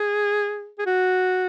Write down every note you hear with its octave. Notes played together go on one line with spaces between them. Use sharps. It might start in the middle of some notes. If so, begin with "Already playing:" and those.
Already playing: G#4
G#4
F#4